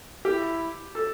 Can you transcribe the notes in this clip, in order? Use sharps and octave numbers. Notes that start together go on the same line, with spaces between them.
E4 G4
A4